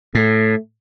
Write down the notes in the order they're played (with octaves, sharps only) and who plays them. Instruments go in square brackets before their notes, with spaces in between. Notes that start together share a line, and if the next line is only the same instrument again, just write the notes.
[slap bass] A2 [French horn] A3